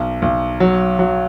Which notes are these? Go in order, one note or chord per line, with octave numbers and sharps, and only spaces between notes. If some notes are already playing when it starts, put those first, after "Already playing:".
Already playing: B1
B1
F#3
F#3